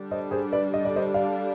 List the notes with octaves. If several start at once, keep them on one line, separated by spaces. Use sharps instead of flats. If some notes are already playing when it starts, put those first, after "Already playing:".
Already playing: D3 G3 D4
C5 D#5
G#4 C5
B4 D5
D#5
D5
C5 D#5
D5 F5